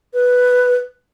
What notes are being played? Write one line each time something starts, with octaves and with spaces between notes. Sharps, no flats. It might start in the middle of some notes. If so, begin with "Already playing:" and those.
B4